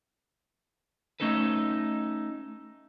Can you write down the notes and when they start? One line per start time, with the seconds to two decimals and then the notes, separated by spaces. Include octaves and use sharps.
1.20 A3 C#4 D#4 A4 B4